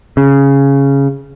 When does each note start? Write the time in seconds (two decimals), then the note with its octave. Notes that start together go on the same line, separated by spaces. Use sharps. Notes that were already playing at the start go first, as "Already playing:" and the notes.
0.17 C#3